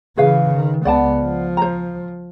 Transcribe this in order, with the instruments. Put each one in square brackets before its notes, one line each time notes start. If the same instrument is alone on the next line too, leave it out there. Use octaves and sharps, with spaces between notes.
[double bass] C#3 E3 [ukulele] G#4 B4 F5
[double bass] D#3
[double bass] C#2 B3 [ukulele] D5 F#5 A5
[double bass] F3
[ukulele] C5 A#5